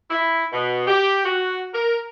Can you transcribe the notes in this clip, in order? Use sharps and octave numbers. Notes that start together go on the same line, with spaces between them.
E4
B2
G4
F#4
A#4